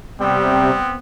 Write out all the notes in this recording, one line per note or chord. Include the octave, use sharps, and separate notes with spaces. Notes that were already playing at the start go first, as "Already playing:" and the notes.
C3 G3 B3 C4